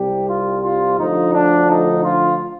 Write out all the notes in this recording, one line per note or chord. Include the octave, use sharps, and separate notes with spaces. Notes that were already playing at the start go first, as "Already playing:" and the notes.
Already playing: C2 C3 G3 G4
F4
F4
D2 D3 F3 D#4
D4
D#4
F4